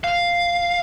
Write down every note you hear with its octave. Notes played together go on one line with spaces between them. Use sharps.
F5